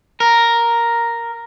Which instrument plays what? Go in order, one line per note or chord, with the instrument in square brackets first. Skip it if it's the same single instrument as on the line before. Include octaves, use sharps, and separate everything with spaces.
[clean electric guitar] A#4